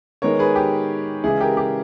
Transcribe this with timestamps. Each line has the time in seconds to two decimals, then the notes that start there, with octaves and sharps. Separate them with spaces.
0.22 D#3 G#3 B3 A#4 C#5
0.39 G#4 B4
0.56 G4
1.24 C#3 E3 G#3 E4 G#4
1.41 G4 A#4
1.57 G4